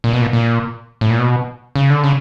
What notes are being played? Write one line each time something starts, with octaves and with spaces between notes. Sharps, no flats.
A#2
B2
A#2
A#2
A2
A#2
B2
C#3
D3
C#3